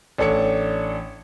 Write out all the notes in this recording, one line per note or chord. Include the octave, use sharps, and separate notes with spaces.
A1 D4 A4 C#5 C#7